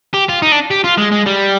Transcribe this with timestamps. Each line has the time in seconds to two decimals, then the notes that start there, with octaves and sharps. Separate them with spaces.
0.14 G4
0.29 F4
0.42 D#4
0.52 D4
0.71 G4
0.84 F4
0.98 G#3
1.12 G#3
1.27 G3